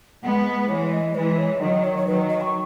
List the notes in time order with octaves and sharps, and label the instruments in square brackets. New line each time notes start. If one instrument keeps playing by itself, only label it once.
[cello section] G#3 B3 [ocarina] F#5
[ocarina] B4
B4
[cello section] E3 G#3 [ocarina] C#5
[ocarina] C#5
D#5
[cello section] E3 G#3 [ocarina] B4
[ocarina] C#5
[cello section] D#3 F#3 [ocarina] D#5
[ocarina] C#5
C#5
[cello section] D#3 F#3 [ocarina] B4
[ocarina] D#5
C#6